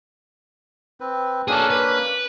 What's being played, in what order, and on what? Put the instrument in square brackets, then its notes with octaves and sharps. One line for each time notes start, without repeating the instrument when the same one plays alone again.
[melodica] C4 B4
[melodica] A#3 C#4 D4 [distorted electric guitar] G#4 A4
[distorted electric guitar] B4